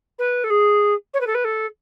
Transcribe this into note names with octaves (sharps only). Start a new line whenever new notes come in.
B4
A4
G#4
C#5
B4
A4
B4
A4